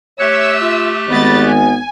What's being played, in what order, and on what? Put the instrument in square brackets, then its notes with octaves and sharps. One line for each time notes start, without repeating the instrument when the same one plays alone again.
[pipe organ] A3 G4 F#6 [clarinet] C#5 [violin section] E5 E6
[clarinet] F4
[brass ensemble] G#1 [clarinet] B3 [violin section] D#5 B5 A6
[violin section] G#5